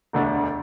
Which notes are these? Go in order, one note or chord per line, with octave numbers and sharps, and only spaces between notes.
E1 D2 D3 A3 D4